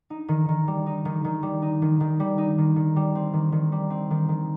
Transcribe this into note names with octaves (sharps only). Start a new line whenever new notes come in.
D#4
D#3
D#3
G3
D#4
D#3
D#3
G3
D#4
D#3
D#3
G3
D#4
D#3
D#3
G3
C4
D#3
D#3
G3
C4
D#3
D#3